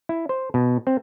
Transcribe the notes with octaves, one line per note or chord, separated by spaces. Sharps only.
E4
C5
B2
C4